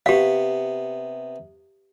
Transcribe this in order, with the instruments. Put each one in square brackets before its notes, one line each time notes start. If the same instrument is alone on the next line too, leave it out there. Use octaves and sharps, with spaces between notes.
[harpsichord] C3 B3 [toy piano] G4 F5